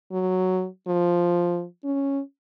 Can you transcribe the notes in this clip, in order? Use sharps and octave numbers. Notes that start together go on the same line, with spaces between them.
F#3
F3
C#4